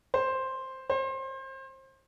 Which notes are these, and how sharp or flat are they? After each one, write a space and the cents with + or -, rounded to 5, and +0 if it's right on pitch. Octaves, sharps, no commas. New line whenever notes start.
C5 +5
C5 +30